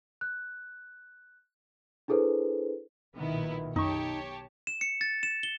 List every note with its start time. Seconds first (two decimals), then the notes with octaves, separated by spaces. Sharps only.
0.21 F#6
2.08 D4 E4 G#4 A4 B4 C5
3.17 B1 A#2 D#3 B3 E4
3.76 B1 F#2 D#4 G4 C#5 A5 C#6
4.67 E7
4.81 C#7
5.01 A6
5.23 E7
5.43 G7